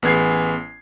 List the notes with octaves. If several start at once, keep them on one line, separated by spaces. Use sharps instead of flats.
A1 B3 G#4 G#6 C7